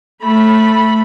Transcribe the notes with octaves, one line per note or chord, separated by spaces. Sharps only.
A3 B5